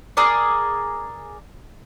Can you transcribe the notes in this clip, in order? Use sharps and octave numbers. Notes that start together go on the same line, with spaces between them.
G#4 A#4 D5